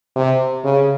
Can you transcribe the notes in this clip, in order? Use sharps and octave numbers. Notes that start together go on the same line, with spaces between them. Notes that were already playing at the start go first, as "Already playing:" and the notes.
C3
C#3